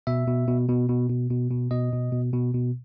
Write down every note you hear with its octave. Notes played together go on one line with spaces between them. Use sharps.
B2 E5
B2
B2
B2
B2
B2
B2
B2
B2 D#5
B2
B2
B2
B2